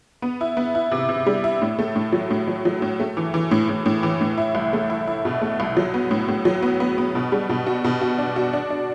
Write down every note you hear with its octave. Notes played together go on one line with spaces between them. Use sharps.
B3
E4
B3
E4
C3
C3
G3
E4
A2
A3
A2
F#3
A2
F#3
F#3
A2
A3
E3
E3
A2
A2
A2
E3
A2
E4
C2
A3
E4
E4
B2
A3
C2
F#3
B3
A2
A2
F#3
B3
B3
B3
B2
G3
B2
F#4
B2
F#4
D4
F#4
D4
D4